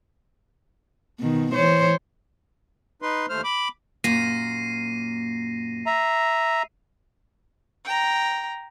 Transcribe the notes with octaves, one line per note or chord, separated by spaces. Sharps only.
B2 D#3
E3 C5 C#5
D#4 B4 C6
D#2 A3 C5 F6
B5 D6
F#2 A#2 A#3 A#6 C7 D#7
E5 A#5
G5 A#5